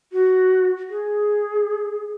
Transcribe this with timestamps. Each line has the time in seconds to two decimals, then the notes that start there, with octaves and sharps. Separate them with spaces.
0.12 F#4
0.90 G#4